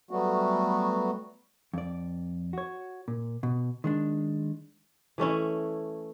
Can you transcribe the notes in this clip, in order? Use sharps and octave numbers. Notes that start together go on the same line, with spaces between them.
F#3 G3 A3 B3 F#4
F2 D5
F#4 C#5
A#2
B2
D#3 G#3 D4
E3 A3 C#4 E4